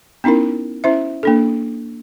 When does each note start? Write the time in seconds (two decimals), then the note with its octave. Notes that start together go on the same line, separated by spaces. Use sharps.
0.24 B3 C#4 D#4 E4 A#4
0.84 C#4 E4 C5 E5
1.23 A#3 D4 A4